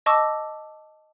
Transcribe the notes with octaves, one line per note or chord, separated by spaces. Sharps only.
D#5 A5 C#6 D6 E6